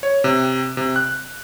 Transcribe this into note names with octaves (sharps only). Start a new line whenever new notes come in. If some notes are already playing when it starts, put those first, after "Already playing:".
C#5
C3
C3
F#6